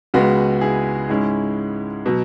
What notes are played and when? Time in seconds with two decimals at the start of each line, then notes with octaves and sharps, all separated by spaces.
0.14 C#2 C#3 G#3 B3 F#4
0.61 E4 G#4
1.09 G#2 G#3 C#4 E4
2.06 B2 F#3